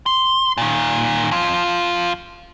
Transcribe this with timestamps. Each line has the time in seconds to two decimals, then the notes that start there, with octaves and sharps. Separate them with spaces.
0.06 C6
0.58 A#2 D#3
1.31 F2 F4